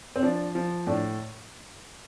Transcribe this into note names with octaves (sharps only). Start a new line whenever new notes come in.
C4
F3 D4
F3
A2 D4